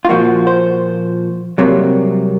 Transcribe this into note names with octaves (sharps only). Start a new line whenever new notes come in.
F4
A#2 F3 A#3 F#4
C5
C2 C3 F#3 A#3